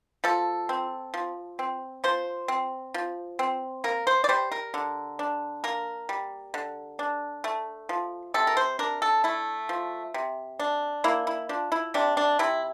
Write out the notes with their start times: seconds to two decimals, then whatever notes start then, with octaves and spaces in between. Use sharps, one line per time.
0.24 F3 A4
0.69 C4
1.14 F3
1.59 C4
2.04 F3 C5
2.48 C4
2.94 F3
3.39 C4
3.84 A#3 A#4
4.07 C5
4.24 D5
4.29 G3 C5
4.52 A#4
4.74 D3
5.19 D4
5.64 A#3 A#4
6.09 G3
6.54 D3
6.99 D4
7.44 A3
7.89 F3
8.34 C3 A4
8.47 A#4
8.57 C5
8.79 D4 A#4
9.02 A4
9.24 A3 E4
9.69 F3
10.14 C3
10.59 D4
11.04 A#3 E4
11.27 E4
11.49 F3 D4
11.72 E4
11.94 C3 D4
12.17 D4
12.39 C3 E4